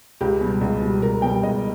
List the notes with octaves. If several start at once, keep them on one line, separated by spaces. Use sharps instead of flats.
C#2 G4
B2 G3
C#2
B2 G3
C#2 A#4
B2 G3 G5
C#2 D#5